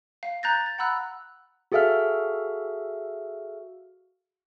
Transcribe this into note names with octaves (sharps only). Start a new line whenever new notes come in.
F5
A#5 F#6 G6 A6 A#6
A6
F#5 A#5 B5 E6 F#6
F#4 G#4 A4 E5 F5 F6